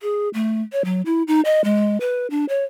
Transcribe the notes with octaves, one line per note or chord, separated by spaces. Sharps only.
G#4
A3
C#5
F#3
E4
D#4
D#5
G#3
B4
D4
C#5